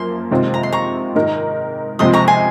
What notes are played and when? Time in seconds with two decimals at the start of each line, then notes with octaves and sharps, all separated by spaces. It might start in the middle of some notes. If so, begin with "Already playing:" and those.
Already playing: F#2 F3 A#3 C6
0.31 C3 D#3 G#3 C4 F4
0.54 A#5
0.63 C6
0.72 A#5 C#6
1.15 G#2 D#3 G#3 D#4 A#4
1.99 C#2 C3 F3 G#3 C4 C6 D#6
2.14 A#5 C#6
2.28 G#5 C6